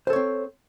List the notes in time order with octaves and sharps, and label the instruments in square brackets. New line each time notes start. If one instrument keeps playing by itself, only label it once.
[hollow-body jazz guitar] C5
A4
C#5
C4